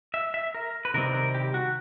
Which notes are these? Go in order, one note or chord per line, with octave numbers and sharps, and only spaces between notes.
E5
E5
A#4
B4
C3 D#3 G3 C4 A#4
A#4
G4
F#4